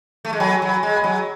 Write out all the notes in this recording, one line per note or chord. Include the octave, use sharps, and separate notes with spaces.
A3
G#3
F#3 G#5 B5
F#3
G#5 B5
G#3
G#5 B5
F#3